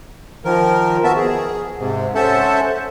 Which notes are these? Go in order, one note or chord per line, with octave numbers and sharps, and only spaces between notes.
D#3 F3 A#4
B3 F#4 E5 A5
G#4
G#2 C3
C#4 A4 C5 E5 F#5 A5